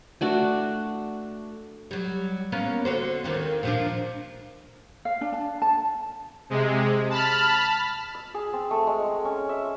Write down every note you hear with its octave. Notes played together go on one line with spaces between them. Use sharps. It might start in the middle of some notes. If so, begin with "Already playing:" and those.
A3 D4 F#4
F#3 G3
A#3 B3 C#4
D3 F#4 C5
D#2 D#3 C4
A#2 F3 D4
F5
D4
A5
A5
C3 G#3
A5 B5 F6
E6
G#4
C4
A3
G#3
G#4
C#4
E5